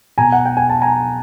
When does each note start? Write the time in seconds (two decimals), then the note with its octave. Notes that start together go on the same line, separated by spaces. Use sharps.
0.18 B2 G#5 A#5
0.32 F#5
0.45 G5
0.57 G#5
0.69 A5
0.82 G#5 A#5